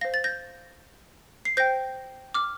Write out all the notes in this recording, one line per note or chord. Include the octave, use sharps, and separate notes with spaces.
C5 F5 A#6
A6
G6 A#6
C7
C5 G5 G6 A#6
D6 F6